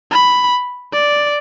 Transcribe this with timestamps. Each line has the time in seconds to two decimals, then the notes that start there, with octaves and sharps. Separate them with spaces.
0.12 B5
0.93 D5